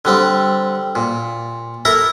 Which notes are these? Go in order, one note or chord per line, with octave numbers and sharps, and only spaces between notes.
D3 G3 C4
A#2
E4 A4 A#4 A#5